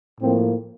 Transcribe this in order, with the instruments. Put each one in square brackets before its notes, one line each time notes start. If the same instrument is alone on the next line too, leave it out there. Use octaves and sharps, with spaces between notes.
[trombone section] A2 F3 A#3 C4